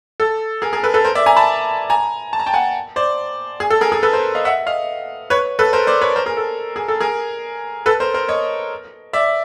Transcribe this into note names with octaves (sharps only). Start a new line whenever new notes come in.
A4
G#4 A#4
G#4 A#4
A4 B4
A4 B4
A#4 C5
D5 E5
G#5 A#5
A5 B5
G#5 A#5
A5
A#5
G5 A5
F#5 G#5
C5 D5
G#4
A4
G#4 A#4
G#4 A#4
A4 B4
A#4 C5
D#5 F5
E5 F#5
D#5 F5
B4 C#5
A4 B4
A#4 C5
C5 D5
B4 C#5
A#4 C5
G#4 A#4
A4
G#4
A4
G#4 A#4
A4 B4
A#4 C5
A#4 C5
C#5 D#5
D5 E5